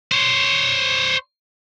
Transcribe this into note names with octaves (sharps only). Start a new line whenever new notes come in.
C5 C#5